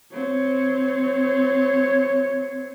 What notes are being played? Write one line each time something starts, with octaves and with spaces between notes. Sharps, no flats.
C4 C#5